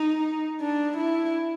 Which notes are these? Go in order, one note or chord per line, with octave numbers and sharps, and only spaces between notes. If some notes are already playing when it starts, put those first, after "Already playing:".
Already playing: D#4
D4
E4